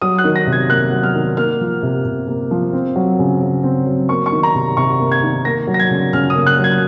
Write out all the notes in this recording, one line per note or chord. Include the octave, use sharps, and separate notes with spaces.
F#3 D#6
F#6
D#3
A#6
C3
G#6
A#3 F#6
F#3
F6
D#3
A#3 F6
F3
C3
C3
A#3
F3
C4
F#3
C#3
C#3
C4
F#3
A#3 C#6
C#6
D#3
A#5
C3
C3 C#6
A#3
G#6
D#3
A#3 A#6
F#3
A#6
G#6
C#3
C#3 F6
D#6
A#3
F#6
F#3
G#6